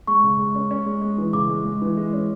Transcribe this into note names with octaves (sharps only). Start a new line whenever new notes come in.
G#3 C#6
C#3
G#3
C#4
C#4
G#3
G#3
E3
C#3 D6
G#3
G#3
E3
G#3
C#4